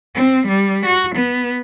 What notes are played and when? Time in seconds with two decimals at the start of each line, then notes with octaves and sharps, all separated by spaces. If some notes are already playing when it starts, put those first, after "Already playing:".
0.15 C4
0.48 G3
0.86 F#4
1.16 B3